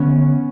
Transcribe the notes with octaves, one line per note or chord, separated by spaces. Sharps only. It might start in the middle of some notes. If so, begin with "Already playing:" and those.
Already playing: D3 B3 C#4